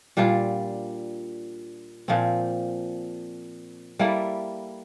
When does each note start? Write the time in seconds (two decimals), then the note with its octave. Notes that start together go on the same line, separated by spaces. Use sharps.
0.17 A#2 G3 D4 F4
2.08 A#2 F3 C4
3.99 G3 A#3 E4 A4